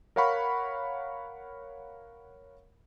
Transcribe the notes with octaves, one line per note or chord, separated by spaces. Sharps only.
A#4 C#5 F5 F#5 B5 C#6